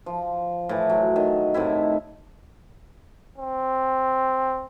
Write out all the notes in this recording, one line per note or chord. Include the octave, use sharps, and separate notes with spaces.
F3
A2 E3
F#3
D#3
A2 C3 D#3 E4
C4